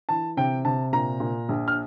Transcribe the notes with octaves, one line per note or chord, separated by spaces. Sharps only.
E3 A5
C3 G5
C3 A5
A#2 A#5
A#2
A#1
F6